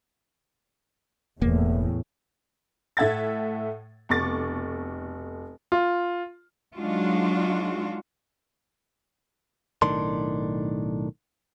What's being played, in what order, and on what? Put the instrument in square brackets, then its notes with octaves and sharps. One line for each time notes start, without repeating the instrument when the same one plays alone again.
[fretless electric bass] E1 A#3 [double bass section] E2 A2
[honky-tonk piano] A2 A3 E5 F#5 G#6 A6
F1 B2 A4 C#6 D6 A6
[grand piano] F4
[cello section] F#3 G#3 D4 D#4 F4 F#4
[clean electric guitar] B1 A2 D#3 D4 C6